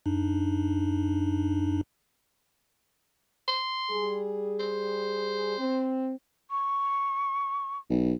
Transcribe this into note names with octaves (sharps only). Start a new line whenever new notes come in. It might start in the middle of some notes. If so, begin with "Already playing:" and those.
F#2 D4 D#4
C6
G3 G#4
C5
C4
C#6
B1